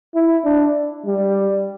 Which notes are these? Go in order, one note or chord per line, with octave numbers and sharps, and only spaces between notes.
E4
D4
G3